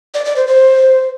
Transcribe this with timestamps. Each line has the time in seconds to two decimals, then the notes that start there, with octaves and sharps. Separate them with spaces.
0.14 D5
0.25 D5
0.36 C5
0.47 C5